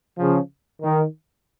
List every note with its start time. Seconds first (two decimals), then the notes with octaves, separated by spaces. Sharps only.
0.18 C#3 F3
0.82 D#3